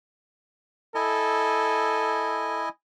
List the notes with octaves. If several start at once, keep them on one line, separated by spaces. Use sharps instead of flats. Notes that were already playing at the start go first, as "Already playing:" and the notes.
E4 A4 D#5 G#5